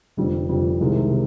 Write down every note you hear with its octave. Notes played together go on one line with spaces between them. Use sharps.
F1 F2 D3 G3
F1 F2 D3 G3
C2 C3 D#3 G#3
C3